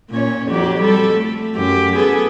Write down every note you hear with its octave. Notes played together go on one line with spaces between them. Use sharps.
A#2 C#4 C#5
F2 F#3 G4
G3 A4
A3
F#2 G4
B3 G#4 A4